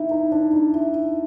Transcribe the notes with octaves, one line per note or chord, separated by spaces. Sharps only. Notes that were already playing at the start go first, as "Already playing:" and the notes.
Already playing: D#4 E4
D#4
D4
D#4
E4